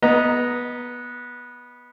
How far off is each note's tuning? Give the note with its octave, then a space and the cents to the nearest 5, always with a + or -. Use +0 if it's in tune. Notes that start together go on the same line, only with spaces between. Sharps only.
B3 -15 D#5 +0 A#5 +0